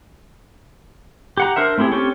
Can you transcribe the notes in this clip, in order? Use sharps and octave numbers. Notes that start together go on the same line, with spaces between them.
G4 F#5 A#5
D4 A#4 C5 E5
A3 C4 E4 G4 G#4
C4 C#4 G4 A4 C#5